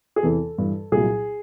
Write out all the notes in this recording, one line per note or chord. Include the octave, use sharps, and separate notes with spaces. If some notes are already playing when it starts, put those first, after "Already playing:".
G#4
E2 C3 E3 A4
G2 E3
C2 A#2 F#3 G#4